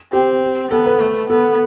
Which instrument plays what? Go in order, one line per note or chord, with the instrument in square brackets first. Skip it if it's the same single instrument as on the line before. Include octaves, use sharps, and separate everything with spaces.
[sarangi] C4 [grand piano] G4
[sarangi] B3 [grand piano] A4
[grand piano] B4
[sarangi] A3
[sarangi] B3 [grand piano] A4